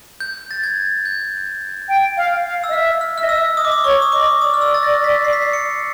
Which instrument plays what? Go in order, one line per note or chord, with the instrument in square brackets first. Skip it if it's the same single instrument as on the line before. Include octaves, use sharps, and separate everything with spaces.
[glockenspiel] G6
A6
G#6
G6
[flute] G5
F5
F5
[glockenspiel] E6
[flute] D#5
[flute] E5 [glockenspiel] F6
[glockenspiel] F6
[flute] E5 [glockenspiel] F6
[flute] D#5
[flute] E5 [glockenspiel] E6
[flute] D#5 [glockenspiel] D#6
[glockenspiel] D6
D#6
[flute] C#5 [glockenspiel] C#6
[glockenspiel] D#6
[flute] D#5 [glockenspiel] D6
[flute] D5 [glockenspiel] D#6
[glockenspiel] F6
E6
A6
A#6
B6
C7
B6
C7
C#7